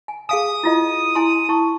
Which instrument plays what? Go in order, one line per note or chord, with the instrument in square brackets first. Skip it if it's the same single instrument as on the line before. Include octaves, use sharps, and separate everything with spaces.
[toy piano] G#5
[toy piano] G#4 F5 G#5 [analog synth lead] D#6
[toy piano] E4 F4 D#5
E4 G#5 C6
E4 A5 C#6